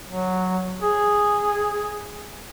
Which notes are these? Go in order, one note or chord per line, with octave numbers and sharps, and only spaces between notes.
F#3
G#4